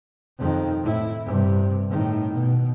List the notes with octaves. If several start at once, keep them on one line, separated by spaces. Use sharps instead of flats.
F2 D#3
A2 E4
G2 C3
A2 D#3
B2